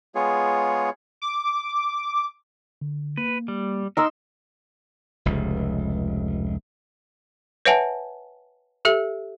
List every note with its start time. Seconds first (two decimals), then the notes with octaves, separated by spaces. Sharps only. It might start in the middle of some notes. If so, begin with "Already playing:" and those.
0.15 G#3 B3 F4 G#4 C#5
1.22 D6
2.81 D3
3.17 A#3 B4
3.48 G3
3.97 D#4 A#4 C6 E6
5.25 F1 C#2
7.65 B4 C#5 E5 F#5 G#5 A5
8.85 G4 A4 E5